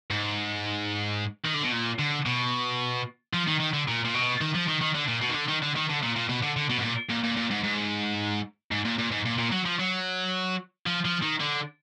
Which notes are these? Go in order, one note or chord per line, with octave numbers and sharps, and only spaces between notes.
G#2
D#3
D3
B2
A#2
D3
B2
F3
D#3
D#3
D3
A#2
A#2
B2
D#3
F3
D#3
D#3
D3
A#2
B2
D#3
D3
D#3
D3
D#3
D3
A#2
A#2
B2
D3
D3
B2
G#2
A#2
A#2
A#2
A#2
G#2
G#2
G#2
A#2
A#2
G#2
A#2
A#2
F#3
F3
F#3
F3
F3
D#3
D3